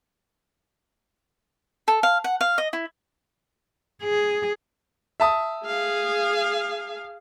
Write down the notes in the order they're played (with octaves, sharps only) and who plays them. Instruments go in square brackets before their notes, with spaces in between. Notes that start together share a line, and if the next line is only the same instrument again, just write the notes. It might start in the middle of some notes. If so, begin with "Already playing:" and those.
[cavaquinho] A4
F5
F#5
F5
D#5
E4
[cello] G#4
[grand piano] E5 A5 D#6
[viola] G#4 F5